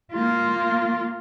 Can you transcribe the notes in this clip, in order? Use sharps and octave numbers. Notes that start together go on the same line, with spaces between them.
A#3 F4